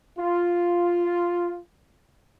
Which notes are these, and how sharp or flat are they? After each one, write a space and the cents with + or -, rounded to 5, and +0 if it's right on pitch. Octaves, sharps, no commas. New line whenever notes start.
F4 +0